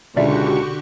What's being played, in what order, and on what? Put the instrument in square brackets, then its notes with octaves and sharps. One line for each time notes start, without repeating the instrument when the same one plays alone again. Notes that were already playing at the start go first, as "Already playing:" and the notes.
[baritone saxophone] C#2 [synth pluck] B2 D5 E5 [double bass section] D3 [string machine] F#4 G4 C#6